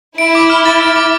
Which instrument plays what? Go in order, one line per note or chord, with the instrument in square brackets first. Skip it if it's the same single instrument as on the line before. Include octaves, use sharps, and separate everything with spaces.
[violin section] E4 [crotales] D7
[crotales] D6
F6
A6
D7
D6